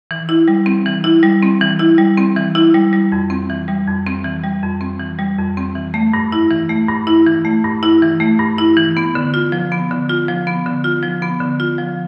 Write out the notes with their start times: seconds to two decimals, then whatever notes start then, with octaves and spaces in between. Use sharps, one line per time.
0.11 E3
0.29 E4
0.48 G3
0.66 C4
0.86 E3
1.04 E4
1.23 G3
1.43 C4
1.61 E3
1.79 E4
1.98 G3
2.18 C4
2.37 E3
2.55 E4
2.74 G3
2.93 G3
3.12 F2
3.30 C4
3.49 E3
3.68 G3
3.87 F2
4.07 C4
4.25 E3
4.44 G3
4.63 F2
4.81 C4
5.00 E3
5.19 G3
5.38 F2
5.57 C4
5.75 E3
5.94 A3
6.14 G2
6.32 E4
6.51 E3
6.69 A3
6.89 G2
7.07 E4
7.27 E3
7.45 A3
7.65 G2
7.83 E4
8.02 E3
8.20 A3
8.39 G2
8.58 E4
8.77 E3
8.97 B3
9.15 D3
9.34 F4
9.52 F3
9.72 B3
9.91 D3
10.09 F4
10.28 F3
10.47 B3
10.66 D3
10.84 F4
11.03 F3
11.22 B3
11.40 D3
11.60 F4
11.78 F3